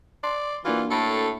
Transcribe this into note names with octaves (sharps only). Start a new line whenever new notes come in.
D5 C6
E3 A#3 D4 F4 F#4
A2 A4